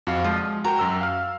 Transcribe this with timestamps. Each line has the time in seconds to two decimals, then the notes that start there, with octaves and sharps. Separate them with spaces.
0.07 F2 F#4 F5
0.24 F3 G#3
0.64 F#4 A#4 G5 A#5
0.79 F#2 E6
1.01 F5 F6